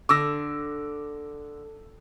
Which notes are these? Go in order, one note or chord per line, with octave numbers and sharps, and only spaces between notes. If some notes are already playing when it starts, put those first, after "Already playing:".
D3 D6 E6 A#6